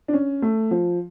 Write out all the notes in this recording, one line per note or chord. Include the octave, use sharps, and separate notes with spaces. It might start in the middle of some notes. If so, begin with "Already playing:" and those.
D4
C#4
A3
F3